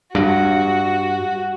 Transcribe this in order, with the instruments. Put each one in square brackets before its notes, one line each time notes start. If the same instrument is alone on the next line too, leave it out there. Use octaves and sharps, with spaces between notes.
[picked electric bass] G2 [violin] F#4